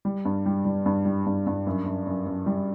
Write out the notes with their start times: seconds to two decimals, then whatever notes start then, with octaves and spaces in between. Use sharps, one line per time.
0.05 G3
0.25 G2
0.46 G3
0.65 G3
0.86 G2
1.05 G3
1.26 G2
1.46 G2
1.67 F#2
1.86 F#2
2.07 F#2
2.26 F#2
2.46 G3